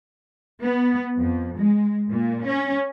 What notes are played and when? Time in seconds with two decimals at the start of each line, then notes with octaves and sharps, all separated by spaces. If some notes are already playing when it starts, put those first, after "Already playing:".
0.62 B3
1.18 F2
1.58 G#3
2.10 A#2
2.45 C#4